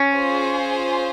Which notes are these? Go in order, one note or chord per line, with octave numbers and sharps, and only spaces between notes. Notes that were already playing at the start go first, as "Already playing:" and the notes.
Already playing: C#4
F4 G#4 C5